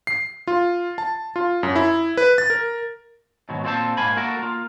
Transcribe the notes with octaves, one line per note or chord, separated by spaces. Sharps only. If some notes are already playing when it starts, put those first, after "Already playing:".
C7
F4
A5
F4
F#2
E4
B4
A6
A#4
G#2 B2 D#3 F#3
A#2 C4 E4 A4 C5 A5
G#2 A#3 C5 G#5 B5
A#3 E4 F#4 A4 A#4
A#3 F4